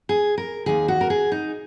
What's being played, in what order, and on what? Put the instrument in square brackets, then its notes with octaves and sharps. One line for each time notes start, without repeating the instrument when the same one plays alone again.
[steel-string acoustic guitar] G#4
A#4
D#2 D#3 G#4
F#4
A#4
G#4
D#4